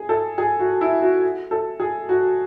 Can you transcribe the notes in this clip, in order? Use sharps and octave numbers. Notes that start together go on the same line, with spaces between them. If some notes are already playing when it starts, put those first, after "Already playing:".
Already playing: G#4
A4
G#4
F#4
E4
F#4
A4
G#4
F#4